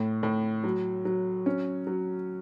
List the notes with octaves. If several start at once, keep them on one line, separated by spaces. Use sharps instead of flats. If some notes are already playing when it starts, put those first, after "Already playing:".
Already playing: A2
A2
F#3
F#3
C#4
F#3